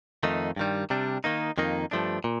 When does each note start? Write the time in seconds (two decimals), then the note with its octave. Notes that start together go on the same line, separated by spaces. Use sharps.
0.23 F2 D#3 A3 D#4
0.56 G2 D#3 G3
0.90 C3 G3 D4
1.24 D#3 A#3 D#4
1.58 F2 D#3 A#3 D#4
1.91 G2 F3 A3 D4
2.24 A#2